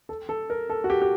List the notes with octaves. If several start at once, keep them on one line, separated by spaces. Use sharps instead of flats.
A4
A4
A#4
A4
F#4
G4
G4